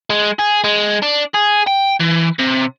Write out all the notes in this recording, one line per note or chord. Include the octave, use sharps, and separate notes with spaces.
G#3
G#4
G#3
D4
G#4
G5
E3
C3